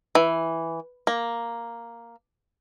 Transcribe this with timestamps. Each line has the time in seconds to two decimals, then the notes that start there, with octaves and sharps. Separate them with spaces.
0.15 E3
1.07 A#3